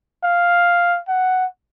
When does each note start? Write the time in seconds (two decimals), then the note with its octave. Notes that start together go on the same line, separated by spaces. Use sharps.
0.24 F5
1.08 F#5